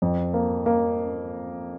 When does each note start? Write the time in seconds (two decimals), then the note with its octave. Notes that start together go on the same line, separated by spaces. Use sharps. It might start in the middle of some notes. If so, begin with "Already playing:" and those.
0.02 F2
0.34 A#3
0.66 A#3